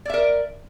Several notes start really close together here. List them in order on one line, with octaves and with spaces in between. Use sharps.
D5 E5 A#4